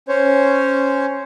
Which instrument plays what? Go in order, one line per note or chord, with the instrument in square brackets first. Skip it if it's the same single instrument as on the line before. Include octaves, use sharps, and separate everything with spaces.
[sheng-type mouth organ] C#4 C5 C#5